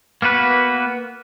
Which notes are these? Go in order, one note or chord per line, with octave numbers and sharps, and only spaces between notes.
A#3 B3 F#4 B4